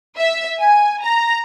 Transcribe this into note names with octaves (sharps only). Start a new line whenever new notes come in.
E5
G#5
A#5